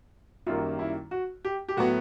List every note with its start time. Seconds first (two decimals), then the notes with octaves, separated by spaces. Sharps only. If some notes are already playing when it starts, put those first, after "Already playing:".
0.46 F#2 D#3 G3 A#3 F4
0.79 E4
1.11 F#4
1.45 G4
1.69 G4
1.77 A2 F#3 B3 F#4